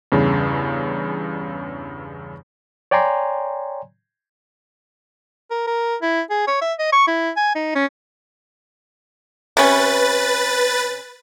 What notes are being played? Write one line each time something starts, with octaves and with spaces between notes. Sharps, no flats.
E2 G2 C#3
C#5 D5 G5 G#5 A#5 C6
A#4
A#4
E4
G#4
C#5
E5
D#5
C#6
E4
G#5
D#4
C#4
C3 C#4 B4 A6